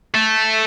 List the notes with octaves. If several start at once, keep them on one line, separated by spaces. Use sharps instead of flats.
A3